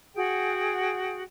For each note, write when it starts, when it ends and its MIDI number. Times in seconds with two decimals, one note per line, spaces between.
0.15 1.22 66
0.15 1.22 68
0.15 1.22 78
0.15 1.22 79